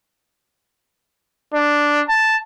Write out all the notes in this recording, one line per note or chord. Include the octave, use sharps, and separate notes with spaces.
D4
A5